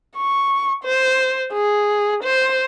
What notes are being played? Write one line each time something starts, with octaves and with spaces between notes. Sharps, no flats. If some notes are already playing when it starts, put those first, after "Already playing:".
C#6
C5
G#4
C5